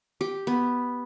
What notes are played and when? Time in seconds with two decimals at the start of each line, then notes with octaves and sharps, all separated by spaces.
0.21 G4
0.47 B3